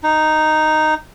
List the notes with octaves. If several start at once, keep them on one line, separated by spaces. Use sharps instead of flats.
D#4